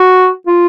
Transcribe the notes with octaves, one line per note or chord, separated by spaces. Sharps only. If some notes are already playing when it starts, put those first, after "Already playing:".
Already playing: F#4
F4